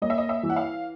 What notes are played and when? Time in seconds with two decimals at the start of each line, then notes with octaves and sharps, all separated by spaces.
0.02 A#3 D#5
0.10 E5
0.18 D#5
0.29 E5
0.43 E3
0.50 F#5
0.56 F5